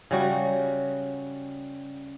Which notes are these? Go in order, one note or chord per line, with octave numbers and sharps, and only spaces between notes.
C#3 G3 F#4